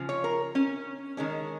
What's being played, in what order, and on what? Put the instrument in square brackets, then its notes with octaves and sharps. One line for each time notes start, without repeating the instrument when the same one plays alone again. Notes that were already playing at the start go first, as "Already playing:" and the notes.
Already playing: [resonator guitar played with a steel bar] C#3 F3
C#5
A#4
C#4
D#3 G#3 C#4